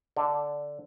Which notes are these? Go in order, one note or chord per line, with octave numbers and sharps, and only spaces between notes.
D3